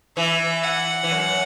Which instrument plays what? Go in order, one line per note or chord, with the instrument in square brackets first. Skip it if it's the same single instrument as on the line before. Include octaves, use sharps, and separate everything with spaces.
[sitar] E3 [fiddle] E5
[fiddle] F#5
[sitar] E3
F#2